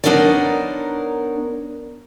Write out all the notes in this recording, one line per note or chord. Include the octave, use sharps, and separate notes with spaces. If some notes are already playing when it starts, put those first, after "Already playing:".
B3 D4 D#4 A#4 C#5 D5